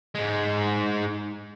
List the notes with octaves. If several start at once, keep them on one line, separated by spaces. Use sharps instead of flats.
G#2 G#3